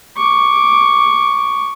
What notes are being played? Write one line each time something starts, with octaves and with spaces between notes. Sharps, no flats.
C#6 D6